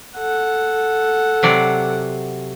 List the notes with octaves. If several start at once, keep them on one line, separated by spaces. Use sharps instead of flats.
A4 F#5
C3 F#3 D5